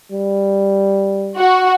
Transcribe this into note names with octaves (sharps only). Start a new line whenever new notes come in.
G3
F#4